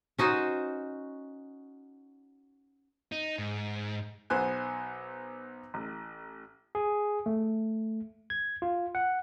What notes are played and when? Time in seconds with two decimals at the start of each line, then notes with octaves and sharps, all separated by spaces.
0.18 C#4 D#4 F#4 C5
3.12 D#4
3.38 G#2
4.30 B1 B3 C5 G#5 F#6
5.74 A1
6.75 G#4
7.26 A3
8.30 G#6
8.62 F4
8.95 F#5